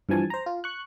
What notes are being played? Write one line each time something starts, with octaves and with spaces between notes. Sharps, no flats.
G2 E3 F3 G#5 A5
C5 A#5
F4
C#6 F#6